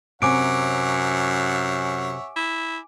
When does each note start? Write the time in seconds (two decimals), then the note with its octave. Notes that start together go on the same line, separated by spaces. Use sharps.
0.22 F#2 C3 C#5 E5 F#5 G#5 D6 D7
2.36 E4